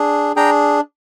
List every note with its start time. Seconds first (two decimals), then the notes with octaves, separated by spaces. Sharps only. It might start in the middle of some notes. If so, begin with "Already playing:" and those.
Already playing: D4 G#4
0.36 D4 G#4 G5 A#5